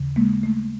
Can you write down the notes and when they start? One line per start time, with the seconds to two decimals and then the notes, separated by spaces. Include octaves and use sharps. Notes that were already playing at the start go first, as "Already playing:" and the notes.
Already playing: D#2 C#3 E3
0.16 G#3 A#3
0.43 A3